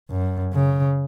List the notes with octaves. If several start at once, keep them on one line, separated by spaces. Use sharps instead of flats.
F#2
C#3